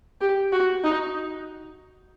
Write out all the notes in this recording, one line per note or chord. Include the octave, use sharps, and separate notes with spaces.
G4
F#4
D#4